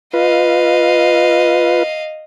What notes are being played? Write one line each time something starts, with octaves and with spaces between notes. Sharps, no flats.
F4 B4 D#5 F5